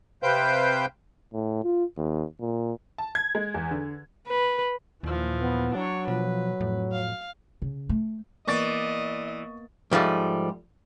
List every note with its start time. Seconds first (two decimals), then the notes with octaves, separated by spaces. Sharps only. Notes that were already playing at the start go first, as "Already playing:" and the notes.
0.23 C3 B4 C5 F5 G5 G6
1.33 A2
1.64 F4
1.97 D#2
2.41 A#2
2.98 A5
3.15 G#6
3.35 G#3
3.54 E2
3.71 D3
4.28 B4
5.03 D#2 A#2 E3 F3
5.41 B3
5.75 F#3 D4 C#5
6.08 B2 F3 B4
6.60 F2 A2
6.93 F5
7.62 C#3
7.89 A3
8.48 E3 A#3 B3 D5 D#5 C#6 A6
9.91 G#2 F3 G3 A3